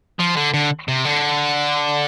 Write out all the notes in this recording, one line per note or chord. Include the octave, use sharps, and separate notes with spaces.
F3
D3
D3
C3
D3